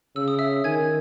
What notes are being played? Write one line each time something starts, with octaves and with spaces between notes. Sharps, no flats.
C#3 E6
D#6
E5 E6
D#3 G#5 G#6